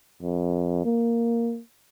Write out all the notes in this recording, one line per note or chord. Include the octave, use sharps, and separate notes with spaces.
F2
A#3